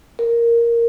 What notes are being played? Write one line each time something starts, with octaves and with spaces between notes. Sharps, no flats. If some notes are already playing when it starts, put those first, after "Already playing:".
A#4